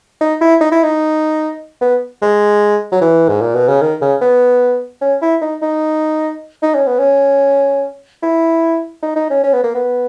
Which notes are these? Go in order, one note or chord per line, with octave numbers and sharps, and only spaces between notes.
D#4
E4
D#4
E4
D#4
B3
G#3
F#3
E3
G#2
A#2
B2
C#3
D#3
C#3
B3
C#4
E4
D#4
D#4
D#4
C#4
B3
C#4
E4
D#4
D#4
C#4
C#4
B3
A#3
B3